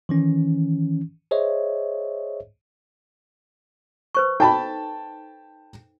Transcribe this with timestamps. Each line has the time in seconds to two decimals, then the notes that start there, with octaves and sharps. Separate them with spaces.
0.09 D#3 E3 C#4
1.31 G#4 C5 C#5 D#5 E5
4.15 B4 C5 C#6
4.40 D#4 A4 G5 A5 B5